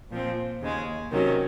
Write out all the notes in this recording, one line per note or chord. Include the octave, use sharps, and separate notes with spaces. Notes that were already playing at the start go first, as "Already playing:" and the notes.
A#2 F3 C4
D#2 C#3 G#3
C3 D#3 F#3 C#4